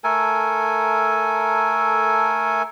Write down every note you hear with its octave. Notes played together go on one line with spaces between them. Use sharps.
A3 A4 A#4 G#5